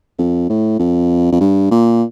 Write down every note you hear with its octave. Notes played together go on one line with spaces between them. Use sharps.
F2
A2
F2
F2
G2
A#2